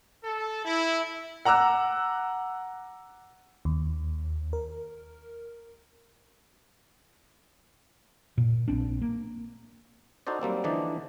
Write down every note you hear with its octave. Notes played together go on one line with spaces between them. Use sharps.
A4
E4
F#5 A#5 D6 E6 F#6
D#2
A#4
A#2
A#1 C4 D4
A#3
D#4 F#4 A4 C5 D5
F#3 G3 A#3 C4
D3 E3 F3 D4 D#4 D5